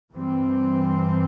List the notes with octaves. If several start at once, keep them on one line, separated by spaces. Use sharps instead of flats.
G2 E3 G3 C4